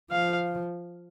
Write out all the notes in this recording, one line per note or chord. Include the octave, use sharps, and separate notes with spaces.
F3 F5